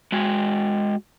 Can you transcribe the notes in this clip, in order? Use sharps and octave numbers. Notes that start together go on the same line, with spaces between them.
G#3 F#4